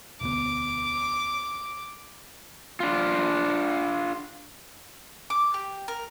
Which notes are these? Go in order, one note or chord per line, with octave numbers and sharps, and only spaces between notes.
E1 D2 B3 D6
D4 F4
D6
G4
A#4